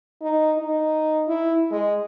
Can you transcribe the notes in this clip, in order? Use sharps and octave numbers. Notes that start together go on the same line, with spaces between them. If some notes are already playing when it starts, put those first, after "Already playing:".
D#4
D#4
E4
G#3